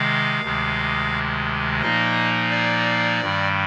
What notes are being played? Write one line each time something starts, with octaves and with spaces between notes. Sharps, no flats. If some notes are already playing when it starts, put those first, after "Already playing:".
Already playing: C3 D#3 G#3 F5
D2 C3 D#3 G#3
A#2 F3 A#3 D#4 D#5
D5
G2 D#3 G3